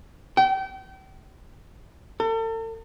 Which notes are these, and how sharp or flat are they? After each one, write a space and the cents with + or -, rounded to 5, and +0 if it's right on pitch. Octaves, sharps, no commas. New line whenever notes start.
G5 -35
A4 +40